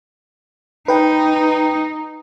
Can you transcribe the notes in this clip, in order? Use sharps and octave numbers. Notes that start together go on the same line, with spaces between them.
D#4 B4 G5